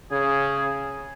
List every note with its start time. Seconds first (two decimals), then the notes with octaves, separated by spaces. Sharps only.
0.11 C#3 G#4